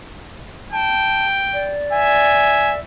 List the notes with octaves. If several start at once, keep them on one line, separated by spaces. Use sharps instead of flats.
G5 A5
D5
E5 G#5